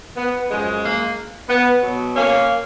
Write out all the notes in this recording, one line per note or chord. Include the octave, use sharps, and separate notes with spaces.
B3
F#2 F3 G#3
A#3
B3
B2 F#3
A#3 C#4